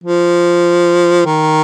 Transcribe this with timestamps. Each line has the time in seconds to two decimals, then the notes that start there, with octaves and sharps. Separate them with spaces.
0.04 F3
1.26 D#3